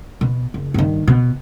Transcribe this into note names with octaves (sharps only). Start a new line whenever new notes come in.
B2
F#1
G2 D#3
B2